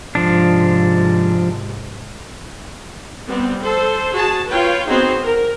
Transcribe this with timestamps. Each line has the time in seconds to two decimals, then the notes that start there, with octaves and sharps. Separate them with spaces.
0.15 G#2 C3 F3 D4
3.27 G3 B3 C4
3.62 A4 C5
4.12 F#4 G#4 A5
4.49 F4 B4 C#5 G5
4.87 B3 C4 D#4 F#4 G#4 C5
5.23 A#4